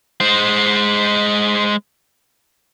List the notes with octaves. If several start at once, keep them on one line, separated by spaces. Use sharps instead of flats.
G#3 C5